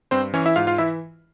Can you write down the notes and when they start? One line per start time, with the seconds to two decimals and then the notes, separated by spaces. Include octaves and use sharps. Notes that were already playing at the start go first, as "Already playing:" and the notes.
0.11 G2 C4 C5
0.34 E3 C#4 C#5
0.46 E4 E5
0.56 G#2 F4 F5
0.67 F4 F5
0.78 E3 E4 E5